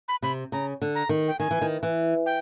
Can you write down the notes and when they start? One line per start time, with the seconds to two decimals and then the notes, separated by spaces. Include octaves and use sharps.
0.08 B5
0.22 C3 B5
0.52 C#3 A#5
0.82 D3
0.95 A#5
1.09 D#3
1.28 G5
1.39 D#3 G#5
1.51 E3
1.62 D#3
1.83 E3
2.26 G5